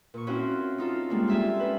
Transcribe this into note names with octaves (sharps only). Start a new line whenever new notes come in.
A#2 C#6
C4 C#4 E4 F#4 C5 F5
D#4 F4 A4
G3 G#3 A#3 D4
F4 G4 A4 E5 F5 G#5
C#4 A4 B4